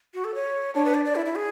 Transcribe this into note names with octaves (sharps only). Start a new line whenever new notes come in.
F#4
A4
C#5
D4 C#5
B4
D5
D5
E4
E4
G#4